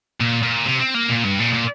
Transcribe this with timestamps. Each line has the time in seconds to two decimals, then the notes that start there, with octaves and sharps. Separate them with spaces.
0.21 A#2
0.43 A#2
0.65 C3
0.79 C4
0.94 A#3
1.09 A#2
1.24 G2
1.39 A#2
1.53 A#2